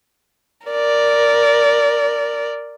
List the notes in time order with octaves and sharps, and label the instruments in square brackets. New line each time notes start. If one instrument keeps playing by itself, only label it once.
[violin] A#4 D5